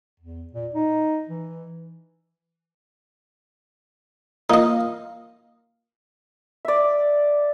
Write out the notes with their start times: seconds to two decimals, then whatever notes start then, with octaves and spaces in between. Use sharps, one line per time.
0.20 E2
0.52 A#2
0.75 D#4
1.29 E3
4.50 A#3 D#4 F4 D#5 F5
6.65 D5 E5